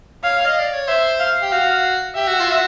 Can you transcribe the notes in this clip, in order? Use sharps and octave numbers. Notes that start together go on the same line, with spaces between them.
C#5 F5
D#5
D5
C#5
C5 E5
F5
G4
F#4 F5
G4 E5
F#4
F4
F#4